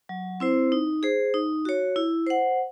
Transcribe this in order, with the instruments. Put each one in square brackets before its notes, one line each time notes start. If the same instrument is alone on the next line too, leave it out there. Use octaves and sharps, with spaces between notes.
[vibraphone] F#3
C4 E4 C5
D#4
G#4 C5
D#4
F#4 C#5
E4
C5 F#5